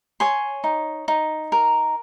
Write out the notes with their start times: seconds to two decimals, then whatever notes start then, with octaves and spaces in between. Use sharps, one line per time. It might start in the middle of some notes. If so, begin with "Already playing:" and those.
0.20 C#5 G#5 C6
0.64 D#4
1.08 D#4
1.52 A#4